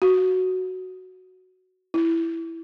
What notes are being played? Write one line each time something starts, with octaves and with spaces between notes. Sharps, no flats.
F#4
E4